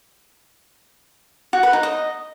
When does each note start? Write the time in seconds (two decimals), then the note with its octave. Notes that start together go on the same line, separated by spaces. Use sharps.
1.53 F#4
1.63 B4
1.73 D#4
1.83 D#5